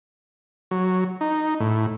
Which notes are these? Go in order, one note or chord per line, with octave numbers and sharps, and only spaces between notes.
F#3
D#4
A2